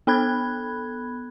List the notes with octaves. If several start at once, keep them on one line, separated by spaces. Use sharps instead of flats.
B3 A4 B5 F#6 G#6